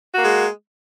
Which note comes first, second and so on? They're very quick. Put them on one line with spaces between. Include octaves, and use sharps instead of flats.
F#4 A#3 G#3